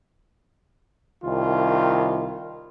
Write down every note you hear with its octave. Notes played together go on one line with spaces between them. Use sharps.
C2 D#3 F4